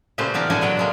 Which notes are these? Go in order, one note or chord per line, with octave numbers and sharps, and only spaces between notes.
A#2 C#3 A3 G4 B4 C5
E3 B3 D4 A#4
A2 D3 D4 F#4 G#5
B2 F#3 F#5 G5
C3 G#3 A#3